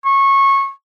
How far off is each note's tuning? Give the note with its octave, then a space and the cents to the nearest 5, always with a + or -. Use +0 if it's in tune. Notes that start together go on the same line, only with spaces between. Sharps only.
C#6 -20